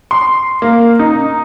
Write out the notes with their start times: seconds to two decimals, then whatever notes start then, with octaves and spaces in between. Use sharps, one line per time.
0.11 C6
0.62 A#3
0.99 D#4